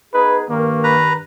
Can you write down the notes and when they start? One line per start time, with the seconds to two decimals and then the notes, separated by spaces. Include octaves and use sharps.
0.13 B3 D#4 G#4 B4
0.50 G2 D#3 A#3
0.84 B4 A#5